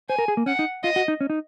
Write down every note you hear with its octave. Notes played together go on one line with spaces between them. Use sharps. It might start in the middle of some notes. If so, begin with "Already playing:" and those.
C5 G#5
A#4
G#4
A#3
C#4 F#5
D#4
F4 D#5
F#4
D#4
C#4
D#4